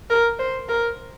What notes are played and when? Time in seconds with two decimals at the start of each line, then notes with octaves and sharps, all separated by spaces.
0.10 A#4
0.39 C5
0.69 A#4